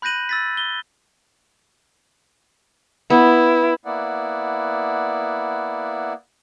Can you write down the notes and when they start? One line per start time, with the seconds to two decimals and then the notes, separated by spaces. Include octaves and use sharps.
0.02 B5 F#6 G6 A#6 D#7 F#7
0.29 E6 A6 B6
0.57 G7
3.10 B3 E4
3.85 A#3 B3 E4 D5 F#5